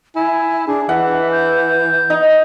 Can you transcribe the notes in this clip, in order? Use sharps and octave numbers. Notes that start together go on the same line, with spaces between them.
E4 G#5
D4 G#4
E3 E5 F#5
G6
D#4